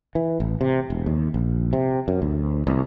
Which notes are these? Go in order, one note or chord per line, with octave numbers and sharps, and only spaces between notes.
E3
A1
C3
E1
D#2
A#1
C3
F#2
D2
C2